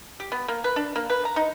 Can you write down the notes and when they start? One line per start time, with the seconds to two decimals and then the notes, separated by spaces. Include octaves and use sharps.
0.20 G4
0.32 B3
0.48 A#3
0.64 B4
0.76 D4
0.96 A#3
1.10 B4
1.25 A#5
1.36 D#4